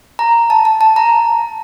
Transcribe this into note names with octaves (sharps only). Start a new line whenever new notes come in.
A#5
A5
A5
A5
A#5